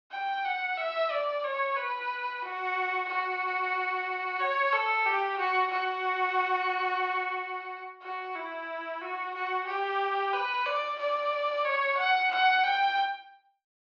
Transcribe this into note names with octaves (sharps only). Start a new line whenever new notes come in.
G5
F#5
E5
D5
C#5
B4
F#4
F#4
C#5
A4
G4
F#4
F#4
F#4
E4
F#4
F#4
G4
B4
D5
D5
C#5
F#5
F#5
G5